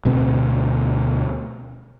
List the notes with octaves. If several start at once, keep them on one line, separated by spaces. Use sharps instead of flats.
D2 B2 C4